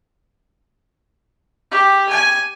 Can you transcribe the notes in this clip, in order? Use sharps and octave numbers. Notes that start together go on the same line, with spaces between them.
G4
G#5